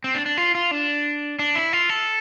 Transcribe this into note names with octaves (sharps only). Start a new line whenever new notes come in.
C4
D4
D4
F4
F4
D4
D4
E4
F4
A4